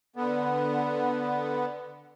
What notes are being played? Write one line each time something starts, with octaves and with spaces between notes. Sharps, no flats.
D3 B3